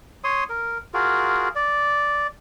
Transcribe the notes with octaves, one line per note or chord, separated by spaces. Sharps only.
C#5 C6 D#6
A#4
F4 F#4 G#4 A#4
D5